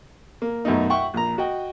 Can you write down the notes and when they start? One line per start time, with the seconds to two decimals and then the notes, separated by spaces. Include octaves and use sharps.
0.42 A#3
0.65 F#2 B2 A3 D#4
0.90 E5 F#5 G5 C#6
1.14 A#1 A#5
1.38 F#4 D#5 G5